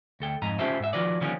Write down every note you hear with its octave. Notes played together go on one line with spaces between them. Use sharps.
D2 A4 G5
F2 G#2 D#4 A#5
C#4 F4 G4 A4 C5 E5
G#2 E5
D#3 F3 F4 F#4 B4 D5
D3 D#3 F3 G3 A#3 C#4